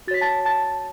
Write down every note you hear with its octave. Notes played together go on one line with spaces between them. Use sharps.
F#4 C#5 A6 B6
A5 A6
A5 A6